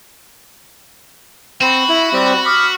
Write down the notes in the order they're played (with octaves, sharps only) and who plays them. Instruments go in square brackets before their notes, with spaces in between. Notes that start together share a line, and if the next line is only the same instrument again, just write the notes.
[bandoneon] C4 C5 [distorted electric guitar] F#4 [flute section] B5
[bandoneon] E4
G3 C4 G4
[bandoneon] B5 [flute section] D6 D#6 F6